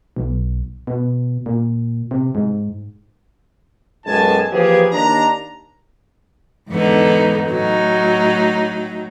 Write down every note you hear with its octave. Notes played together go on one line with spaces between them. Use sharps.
B1
B2
A#2
C3
G#2
B1 F#2 A2 G#3 G#5 A5
E3 F3 A#3 G4 G#4
D#2 D4 A#5
E2 G#2 D3 B3 D#4
A2 F#3 D#4